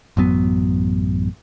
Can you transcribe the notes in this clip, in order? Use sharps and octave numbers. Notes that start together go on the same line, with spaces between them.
A1 F#2 F#3 B3